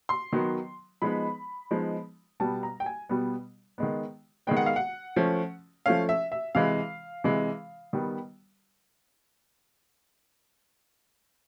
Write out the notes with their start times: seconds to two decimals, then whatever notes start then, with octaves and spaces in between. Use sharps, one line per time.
0.09 C6
0.33 D#3 F#3 B3
1.02 F3 G#3 B3 D#4 B5
1.71 F3 G#3 B3 D#4
2.40 B2 G3 B3 A5
2.63 A#5
2.80 G5
2.86 G#5
3.09 B2 G3 B3
3.78 D#3 G#3 B3
4.47 D#3 G#3 B3 G5
4.57 F#5
4.66 F5
4.76 F#5
5.16 F3 A3 C#4
5.86 F3 A3 C#4 F5
6.09 E5
6.32 E5
6.55 C3 E3 G#3 F5
7.24 C3 E3 G#3
7.93 D#3 G3 B3